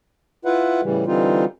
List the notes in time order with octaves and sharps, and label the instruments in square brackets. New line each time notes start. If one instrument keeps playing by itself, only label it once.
[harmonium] E4 F4 B4 E5 F#5
A2 C#3 E3 G3
D3 E3 G3 C4 D#4 F4